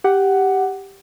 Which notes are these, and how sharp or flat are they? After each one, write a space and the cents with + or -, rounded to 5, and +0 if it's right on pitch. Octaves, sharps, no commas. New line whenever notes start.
G4 +0 F#5 +10